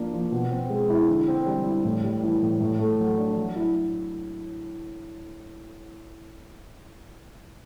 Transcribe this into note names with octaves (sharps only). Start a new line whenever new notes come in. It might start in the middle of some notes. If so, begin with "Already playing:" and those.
Already playing: F3 A#3 D4
F3
B2
C4
G#3
E4
D3
C4
G3
E4
A2
G3
E3
A2
A2
A3
F#3
D4
F#3
E4